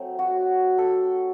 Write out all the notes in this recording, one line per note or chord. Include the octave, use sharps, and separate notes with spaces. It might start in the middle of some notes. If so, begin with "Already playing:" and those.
Already playing: F#3 A3 C4
F#4
A4